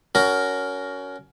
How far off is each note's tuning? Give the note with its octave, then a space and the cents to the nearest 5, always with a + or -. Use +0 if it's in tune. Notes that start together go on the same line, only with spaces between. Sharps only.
C#4 +20 F#4 +15 A#4 +0